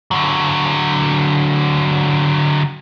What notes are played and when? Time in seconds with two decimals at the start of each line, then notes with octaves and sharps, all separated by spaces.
0.11 D3 F#3